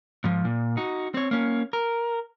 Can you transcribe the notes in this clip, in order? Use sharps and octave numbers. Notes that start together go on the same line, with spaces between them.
G#2 F3
A#2
D#4 F#4
C4 C#5
A#3 C#4
A#4